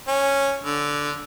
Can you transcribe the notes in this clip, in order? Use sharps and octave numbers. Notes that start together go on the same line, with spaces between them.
C#4
D3